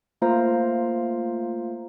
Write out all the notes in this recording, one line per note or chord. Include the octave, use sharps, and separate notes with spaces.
A3 A#3 F4 C5 F5 A#5